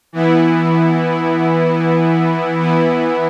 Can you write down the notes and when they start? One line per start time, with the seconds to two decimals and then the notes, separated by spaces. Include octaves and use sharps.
0.13 E3 B3 E4
2.59 E3 B3 E4